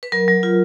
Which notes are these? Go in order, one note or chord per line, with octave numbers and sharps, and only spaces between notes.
B4
F#3 A#4
F#3
F4